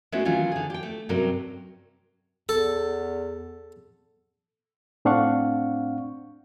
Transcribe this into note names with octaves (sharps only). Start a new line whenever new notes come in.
G#3 A3 B3 C#4 E4 F#4
D#3 E3 F#3 C#4 F4
D3 G#4
G4 G5
A3
G2 C3 F#3 C#4 A#4
E2 A4
A2 C4 D4 F5 F#5 C#6